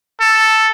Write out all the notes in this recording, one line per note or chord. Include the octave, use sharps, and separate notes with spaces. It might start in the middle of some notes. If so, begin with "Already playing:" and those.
A4